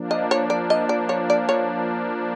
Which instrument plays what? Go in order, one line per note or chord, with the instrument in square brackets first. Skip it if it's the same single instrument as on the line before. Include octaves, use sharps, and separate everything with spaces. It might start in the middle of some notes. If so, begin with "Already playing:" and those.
Already playing: [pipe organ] F3 A#3 D4
[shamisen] D#5
C#5
D5
D#5
D5
C#5
D5
C#5